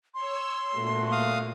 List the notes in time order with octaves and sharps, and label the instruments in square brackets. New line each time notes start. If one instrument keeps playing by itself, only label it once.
[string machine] C#5 E6 [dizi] C6
[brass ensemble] G1 A3 F#4 [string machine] A#2
[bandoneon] F5 D#6